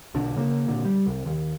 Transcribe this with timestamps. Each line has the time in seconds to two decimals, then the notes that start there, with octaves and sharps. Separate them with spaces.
0.14 B1 D3 D4
0.37 C#3 A#3
0.68 A#2 D3
0.85 G3
1.07 C2
1.25 D#2